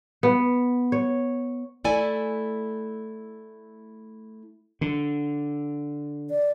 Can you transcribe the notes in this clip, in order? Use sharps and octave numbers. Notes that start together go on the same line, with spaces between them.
B3
C#5
A3 E4 A4 D5 G#5
D3
D5